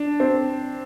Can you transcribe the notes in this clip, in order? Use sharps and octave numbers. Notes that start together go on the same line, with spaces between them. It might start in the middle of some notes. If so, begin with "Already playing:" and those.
Already playing: D4
C4